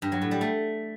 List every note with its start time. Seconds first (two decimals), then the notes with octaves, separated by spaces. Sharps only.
0.02 G2
0.12 F#3
0.22 A2
0.31 G3
0.41 A3